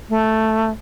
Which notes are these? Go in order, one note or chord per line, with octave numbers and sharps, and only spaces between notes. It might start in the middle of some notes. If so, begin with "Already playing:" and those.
A3